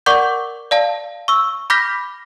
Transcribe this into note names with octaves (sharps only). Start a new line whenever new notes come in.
A#4 D5 F#5 C#6 D6 G6
D5 F5 A5
C#6 E6
B5 D6 F6 G6 A#6 B6